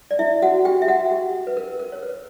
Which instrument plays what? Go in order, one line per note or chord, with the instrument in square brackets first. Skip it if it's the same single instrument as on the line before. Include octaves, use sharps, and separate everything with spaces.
[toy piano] D5
E4 E5
F#4 F#5
G4 G5
E5
F#4 F#5
G4
B4
A#4
A#4
C#5
B4